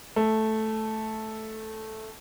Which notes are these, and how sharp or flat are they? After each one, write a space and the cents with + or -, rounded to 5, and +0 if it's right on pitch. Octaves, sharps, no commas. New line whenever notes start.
A3 -5